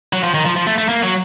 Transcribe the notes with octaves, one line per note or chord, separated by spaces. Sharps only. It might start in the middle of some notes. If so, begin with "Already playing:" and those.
F#3
F3
D#3
F3
F3
A3
A3
A#3
F#3